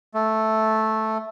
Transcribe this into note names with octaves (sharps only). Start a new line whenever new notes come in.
A3